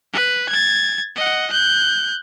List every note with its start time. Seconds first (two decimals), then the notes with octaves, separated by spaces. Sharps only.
0.13 B4
0.49 G#6 A6
1.16 D#5 F#5
1.50 F#6 G6